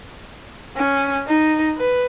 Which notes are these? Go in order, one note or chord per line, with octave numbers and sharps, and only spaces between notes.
C#4
D#4
B4